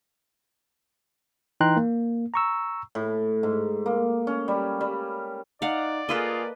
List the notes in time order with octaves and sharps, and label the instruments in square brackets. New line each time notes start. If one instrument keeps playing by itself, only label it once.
[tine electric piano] E3 D#4 G5 A#5 C6 F#6
A#3
A#5 C#6 E6
[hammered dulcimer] A2
G#2
A#3
C#4
G3
G3
[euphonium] D#4 [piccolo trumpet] D5 [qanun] F5 F#5
[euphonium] A#3 [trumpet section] F4 G#4 [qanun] A4 B4 D#5